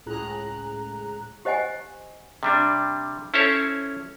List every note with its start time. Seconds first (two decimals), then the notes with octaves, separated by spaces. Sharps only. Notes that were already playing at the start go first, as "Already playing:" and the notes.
0.06 C#2 A2 G#4 A#5 F#6
1.45 G4 C5 D#5 F#5 G#5
2.43 C3 G3 D4
3.34 C#4 E4 A4 C5 C#5